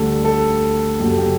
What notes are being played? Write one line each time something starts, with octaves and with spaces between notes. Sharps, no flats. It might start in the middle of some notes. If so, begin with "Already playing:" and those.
Already playing: D2 D3 G3 A4
A4
F#2 C#3 F#3 G4
A4
G4